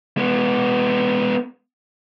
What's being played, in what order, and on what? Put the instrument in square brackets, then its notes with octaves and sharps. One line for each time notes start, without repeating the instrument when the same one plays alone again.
[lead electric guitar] G#3 B3